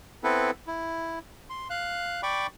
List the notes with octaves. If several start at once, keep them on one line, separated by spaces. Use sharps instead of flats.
B3 C4 E4 A4 B4
E4
C6
F5 F#6
D5 G5 B5 C#6 D6